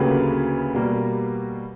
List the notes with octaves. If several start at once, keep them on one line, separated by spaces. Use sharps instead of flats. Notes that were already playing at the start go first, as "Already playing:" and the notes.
Already playing: D2 C#3 F#3 A#3 G4 B4
B2 G3 A#3